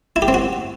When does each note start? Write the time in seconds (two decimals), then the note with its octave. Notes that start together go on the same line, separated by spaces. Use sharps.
0.16 E4
0.22 G4
0.28 C4
0.34 F#4